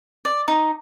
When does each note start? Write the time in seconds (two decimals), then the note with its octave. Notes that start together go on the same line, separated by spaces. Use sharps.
0.25 D5
0.48 D#4